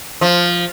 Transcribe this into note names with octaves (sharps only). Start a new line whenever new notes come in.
F3